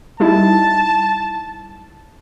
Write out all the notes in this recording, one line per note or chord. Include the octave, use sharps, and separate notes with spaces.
G3 D#4 E4 A5